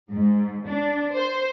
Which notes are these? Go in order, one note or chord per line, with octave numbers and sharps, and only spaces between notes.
G#2
D4
C5